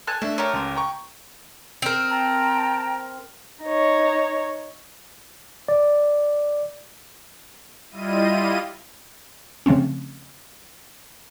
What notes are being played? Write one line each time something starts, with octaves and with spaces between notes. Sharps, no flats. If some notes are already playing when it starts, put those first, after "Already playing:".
A4 G#5 F#6
A3 D4 E5
A3 G4 A#4 C#5
C#2 C#4 C6
G5 A#5 C#6
C4 A#4
G5 A5 A#5
D#4 C#5
D5
G3 E4 F4 D#5 D#7
C#3 F3 A3 C4 C#4